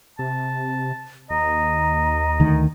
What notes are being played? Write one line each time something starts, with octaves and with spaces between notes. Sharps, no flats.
C3 A5
D#2 D#5 A#5
D2 D#3